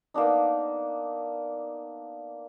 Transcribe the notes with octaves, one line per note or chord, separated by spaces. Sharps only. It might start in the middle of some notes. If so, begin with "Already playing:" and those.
A#3 B3 D4 D#4